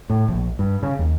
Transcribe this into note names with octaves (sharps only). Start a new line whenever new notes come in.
A2
A#1
G2
C#3
D#2